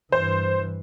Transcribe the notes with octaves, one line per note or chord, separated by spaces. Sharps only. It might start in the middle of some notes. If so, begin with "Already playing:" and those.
G2 E3 C5